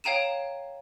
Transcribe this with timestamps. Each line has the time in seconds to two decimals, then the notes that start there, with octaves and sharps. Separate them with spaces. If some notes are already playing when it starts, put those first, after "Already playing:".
0.04 C#5 F5 G5 A#5 D#7 E7